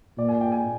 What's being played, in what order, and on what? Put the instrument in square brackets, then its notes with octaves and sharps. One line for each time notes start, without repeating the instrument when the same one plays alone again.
[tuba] A#2 [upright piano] D5
[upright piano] G#5
G5
G#5